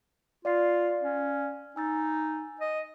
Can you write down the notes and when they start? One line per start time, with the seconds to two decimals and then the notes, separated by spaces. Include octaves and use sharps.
0.45 F4 D5 F5 C7
1.02 C#4
1.76 D#4 G#5 E6 A6
2.60 D#5